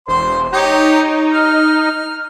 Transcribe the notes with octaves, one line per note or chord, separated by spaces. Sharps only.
E1 C5 C6
D#4 G4 C#5
F6